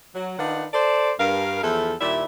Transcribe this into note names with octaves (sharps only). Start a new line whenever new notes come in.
F#3
D#3 D4 D#4 F4 B4 F#5
A4 C5 D5
G2 A#4 F5
E2 F3 E4 A4
D#2 A#2 G3 E4 E5